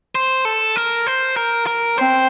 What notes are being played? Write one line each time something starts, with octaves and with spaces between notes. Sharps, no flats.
C5
A4
A#4
C5
A#4
A#4
C4 C5